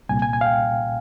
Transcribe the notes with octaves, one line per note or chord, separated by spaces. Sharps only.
C2 A#2 G#5
G#5
G#5
F5
G5